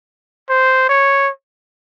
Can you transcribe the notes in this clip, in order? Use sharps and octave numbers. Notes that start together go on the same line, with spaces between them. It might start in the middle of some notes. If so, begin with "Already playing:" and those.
C5
C#5